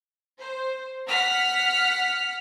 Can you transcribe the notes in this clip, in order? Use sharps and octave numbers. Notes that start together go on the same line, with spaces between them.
C5
F#5 F6 B6